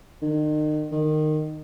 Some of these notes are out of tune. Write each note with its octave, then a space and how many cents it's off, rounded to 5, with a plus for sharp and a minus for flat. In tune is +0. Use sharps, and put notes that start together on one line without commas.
D#3 -35
D#3 -20